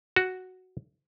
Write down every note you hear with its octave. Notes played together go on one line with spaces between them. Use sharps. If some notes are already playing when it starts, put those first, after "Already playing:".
F#4